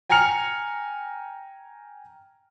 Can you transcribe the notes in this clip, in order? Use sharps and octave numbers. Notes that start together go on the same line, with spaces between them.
G5 G#5 A#5 F6 C#7 F7